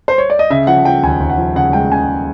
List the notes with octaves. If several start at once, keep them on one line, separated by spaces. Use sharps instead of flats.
C5
C#5
D5
D#5
C#3 E5
F3 F#5
F3 G5
D#2 G#5
D#2
F#5
F3
C#3 F#5
G#3 G5
C#3 G#5